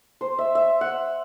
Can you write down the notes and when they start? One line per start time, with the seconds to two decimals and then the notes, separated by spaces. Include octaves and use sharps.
0.21 C5
0.38 E5
0.55 E5
0.81 F#5